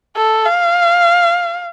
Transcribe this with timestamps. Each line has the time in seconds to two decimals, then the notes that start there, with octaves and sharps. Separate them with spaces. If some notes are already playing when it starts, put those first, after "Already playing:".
0.16 A4
0.45 F5